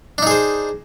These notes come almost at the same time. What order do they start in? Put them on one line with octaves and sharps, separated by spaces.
D4 D#4 G#4 C5